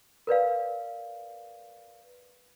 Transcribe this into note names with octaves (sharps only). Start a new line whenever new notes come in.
A#4 B4 D5 F5